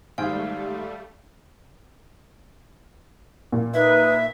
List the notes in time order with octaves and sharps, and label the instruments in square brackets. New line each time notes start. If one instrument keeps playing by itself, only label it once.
[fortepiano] G#2 D#3 G5 [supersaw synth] G3 A3 [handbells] F5
[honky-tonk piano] A#2
[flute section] D#4 B4 F#6 [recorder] E5